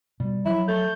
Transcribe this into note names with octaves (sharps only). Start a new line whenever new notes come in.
B2 G3
F3 F#3 E4
A3 G6